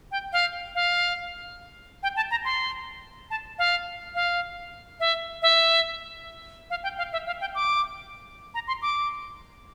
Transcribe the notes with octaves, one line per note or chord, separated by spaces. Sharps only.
G5
F5
F5
G5
A5
A#5
C6
A5
F5
F5
E5
E5
F5
G5
F5
E5
F5
G5
D6
A#5
C6
D6